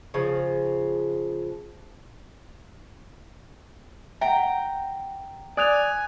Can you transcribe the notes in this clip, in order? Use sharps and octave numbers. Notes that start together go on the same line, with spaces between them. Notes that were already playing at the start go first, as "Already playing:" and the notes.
C#3 F3
E5 F#5 G5 A#5
D5 G#5 D#6 F#6 F7